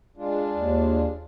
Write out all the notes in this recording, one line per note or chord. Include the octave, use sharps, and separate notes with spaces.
G#3 D4 F4
D#2